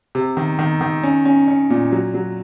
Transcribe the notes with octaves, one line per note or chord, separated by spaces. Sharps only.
C3
D#3
D#3
D#3
C#4
C#4
C#4
A#2
F#3
F#3